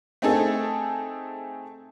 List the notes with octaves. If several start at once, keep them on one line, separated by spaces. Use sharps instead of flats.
A3 C4 D#4 G#4 A4